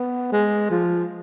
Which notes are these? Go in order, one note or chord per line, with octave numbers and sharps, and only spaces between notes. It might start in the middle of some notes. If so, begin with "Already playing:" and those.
Already playing: B3
G#3
F3